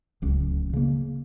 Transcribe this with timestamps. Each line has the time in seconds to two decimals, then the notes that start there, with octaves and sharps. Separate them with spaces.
0.22 D1 C#2
0.73 C#3 A#3